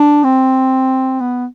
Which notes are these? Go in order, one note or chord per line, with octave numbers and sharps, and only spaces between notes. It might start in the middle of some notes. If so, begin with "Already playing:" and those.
Already playing: D4
C4
B3